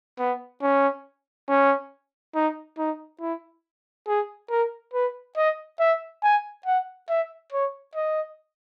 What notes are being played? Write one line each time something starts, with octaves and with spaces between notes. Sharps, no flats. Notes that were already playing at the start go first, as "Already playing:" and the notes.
B3
C#4
C#4
D#4
D#4
E4
G#4
A#4
B4
D#5
E5
G#5
F#5
E5
C#5
D#5